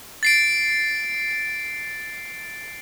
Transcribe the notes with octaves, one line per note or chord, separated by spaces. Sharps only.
A6 C7 D7